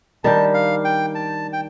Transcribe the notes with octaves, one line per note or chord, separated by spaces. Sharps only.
D#3 G3 D4 G4 A5
F5
G5
A5
G5